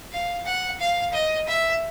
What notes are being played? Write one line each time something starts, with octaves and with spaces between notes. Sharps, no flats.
F5
F#5
F5
D#5
E5